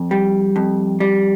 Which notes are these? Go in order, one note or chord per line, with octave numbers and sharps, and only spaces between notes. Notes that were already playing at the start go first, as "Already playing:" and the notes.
Already playing: F2
G3
F2
G3